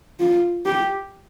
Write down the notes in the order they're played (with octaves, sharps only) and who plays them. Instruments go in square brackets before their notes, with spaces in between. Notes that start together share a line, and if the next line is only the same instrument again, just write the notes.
[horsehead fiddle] F4
G4